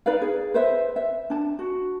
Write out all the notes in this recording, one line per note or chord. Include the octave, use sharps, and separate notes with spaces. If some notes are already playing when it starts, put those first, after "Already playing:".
D#4 B4 D5 F5
G#4
B4 C5 E5
E5
D4 A5
F#4